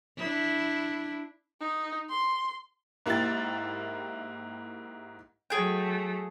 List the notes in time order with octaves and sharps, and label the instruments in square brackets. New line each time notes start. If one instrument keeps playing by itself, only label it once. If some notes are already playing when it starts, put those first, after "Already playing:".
[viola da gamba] D4 E4
[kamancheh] D#4
C6
[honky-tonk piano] G#2 A#3 E4 G4 G5 A6
[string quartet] F#3 A3 [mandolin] G#4 G5